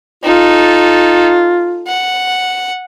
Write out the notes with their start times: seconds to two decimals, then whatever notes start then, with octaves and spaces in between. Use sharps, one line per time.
0.24 D#4 F4 A4
1.87 F#5